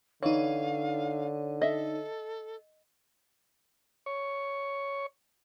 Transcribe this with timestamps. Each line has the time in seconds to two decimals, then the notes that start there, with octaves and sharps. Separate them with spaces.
0.23 D3 E3 D#4 C#5 F5
1.62 A4 D#5 E5
4.06 C#5 C#6